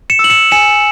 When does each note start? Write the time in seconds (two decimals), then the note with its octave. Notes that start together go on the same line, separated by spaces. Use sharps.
0.10 C#7 E7
0.19 E6
0.24 F#7
0.30 C#7 E7
0.51 G#5 C#7 E7